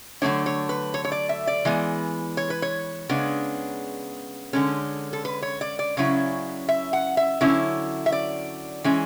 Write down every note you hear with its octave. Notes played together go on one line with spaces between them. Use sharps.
D3 F#3 A3 D4 C#5
C#5
B4
C#5
C#5
D5
E5
D5
E3 G#3 B3
C#5
B4
C#5
C#3 G#3 B3 D4
D3 G#3 C#4 A4
A4
B4
C#5
D5
D5
C#3 F#3 C#4 E4
E5
F#5
E5
D3 F#3 C#4 E4
E5
D5
E3 G#3 C#4